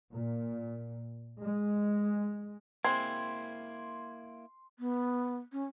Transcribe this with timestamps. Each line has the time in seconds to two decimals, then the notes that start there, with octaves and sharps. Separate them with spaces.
0.12 A#2
1.42 G#3
2.84 G#3 A#3 C4 E4 C6 G#6
4.79 B3
5.52 C#4